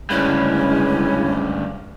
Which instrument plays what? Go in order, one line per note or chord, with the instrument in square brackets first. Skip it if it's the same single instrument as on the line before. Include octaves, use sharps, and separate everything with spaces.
[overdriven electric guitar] D2 G2 [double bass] C#3 G#3 [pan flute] C#4 [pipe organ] E4 C#5